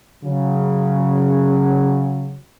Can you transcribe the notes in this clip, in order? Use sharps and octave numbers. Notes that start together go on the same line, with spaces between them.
C#3 F#3